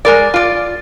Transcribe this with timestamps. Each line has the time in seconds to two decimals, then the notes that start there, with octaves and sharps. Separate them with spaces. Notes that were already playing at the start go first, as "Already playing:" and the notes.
0.05 G#3 A#4 D5
0.34 F4 D5